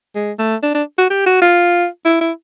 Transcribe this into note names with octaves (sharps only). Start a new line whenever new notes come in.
G#3
A3
D4
D4
F#4
G4
F#4
F4
E4
E4